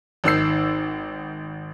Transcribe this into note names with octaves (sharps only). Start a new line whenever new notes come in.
G#1 D#3 E6 C7